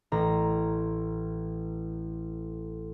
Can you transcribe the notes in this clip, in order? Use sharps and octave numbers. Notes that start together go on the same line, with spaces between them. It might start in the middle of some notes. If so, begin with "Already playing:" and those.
A1 A#5